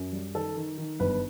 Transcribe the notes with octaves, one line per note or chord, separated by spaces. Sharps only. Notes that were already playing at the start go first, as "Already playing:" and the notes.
Already playing: F#2
G3
D#3 A4
D#3
D#3
G1 B4